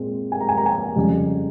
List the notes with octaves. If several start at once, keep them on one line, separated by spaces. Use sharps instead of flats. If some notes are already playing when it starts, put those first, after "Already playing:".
Already playing: A#2 G#3 C4
G#5
A#5
G#5
A#5
G#5
F2 C#3 G3